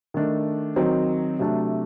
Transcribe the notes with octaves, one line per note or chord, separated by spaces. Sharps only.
D#3 A3 D4
D#3 F#3 C4 D#4
C3 F#3 A3 D4